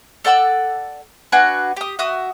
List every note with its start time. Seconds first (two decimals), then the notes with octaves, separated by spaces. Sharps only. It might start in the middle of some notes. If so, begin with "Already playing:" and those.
0.25 A4 D5 F#5 E6
1.32 D4 F#4 B4 G#5
1.77 G4 D#6
1.99 F#4 E5 D#6